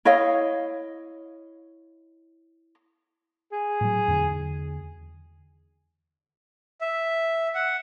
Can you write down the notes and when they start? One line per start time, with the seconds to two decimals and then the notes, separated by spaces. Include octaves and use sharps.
0.05 E4 C#5 D#5 F5
3.52 G#4
3.81 A2 F#3
4.08 E2 D3 D4
6.81 E5
7.55 F#5